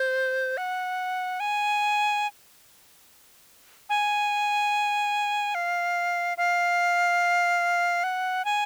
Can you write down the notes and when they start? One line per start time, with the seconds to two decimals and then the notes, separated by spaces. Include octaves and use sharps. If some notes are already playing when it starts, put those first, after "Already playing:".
Already playing: C5
0.57 F#5
1.40 G#5
3.90 G#5
5.55 F5
6.38 F5
8.04 F#5
8.45 G#5